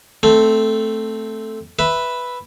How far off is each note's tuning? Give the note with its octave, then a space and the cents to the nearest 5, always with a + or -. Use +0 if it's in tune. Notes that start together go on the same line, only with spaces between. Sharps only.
A3 +0 C4 +0
B4 +0 E5 +0